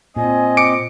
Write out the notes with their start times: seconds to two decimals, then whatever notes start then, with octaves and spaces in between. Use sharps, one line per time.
0.16 A#2 C4 D#5 G#5
0.57 D6 C#7 D7